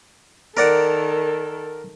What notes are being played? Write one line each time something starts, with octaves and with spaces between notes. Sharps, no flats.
D#3 A4 A#4 D5 F#5